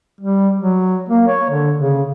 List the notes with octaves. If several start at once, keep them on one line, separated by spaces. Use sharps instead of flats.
G3
F#3
A#3
C#5
D3
C#3